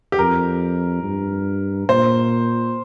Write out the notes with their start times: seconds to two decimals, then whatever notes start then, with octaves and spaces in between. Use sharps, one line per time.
0.12 G4
0.19 F2 A#4
1.04 G2
1.89 A#2 C5